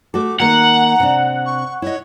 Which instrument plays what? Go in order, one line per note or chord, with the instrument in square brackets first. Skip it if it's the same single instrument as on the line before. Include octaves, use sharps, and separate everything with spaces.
[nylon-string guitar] A3 F#4 A4 [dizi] D6
[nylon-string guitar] D#3 A#3 [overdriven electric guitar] F#5 [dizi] A#5
[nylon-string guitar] C3 D4
[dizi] C#6
[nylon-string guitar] E4 D#5 [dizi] C#5